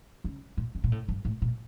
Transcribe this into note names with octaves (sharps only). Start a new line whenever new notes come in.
C#3
A#2
C#3
A#2
A2
G2
A2
A#2